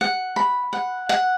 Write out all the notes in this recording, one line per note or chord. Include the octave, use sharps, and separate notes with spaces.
F#5
B5
F#5
F#5